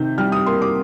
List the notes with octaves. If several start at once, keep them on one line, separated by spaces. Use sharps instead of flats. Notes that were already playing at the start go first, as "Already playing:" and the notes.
Already playing: C3 D#3 G6
G3 F6
D#6
A#3 C6
D6